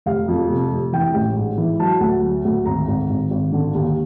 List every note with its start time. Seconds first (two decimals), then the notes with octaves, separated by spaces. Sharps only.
0.06 F1 F5
0.28 F2
0.50 C3
0.71 F1
0.93 E3 G5
1.14 A1
1.37 G#2
1.58 E3
1.79 F#3 A5
2.00 D2
2.22 F#3
2.45 D2
2.65 G#1 A#5
2.88 G#1
3.09 G#1
3.31 G#1
3.52 D3
3.74 D#2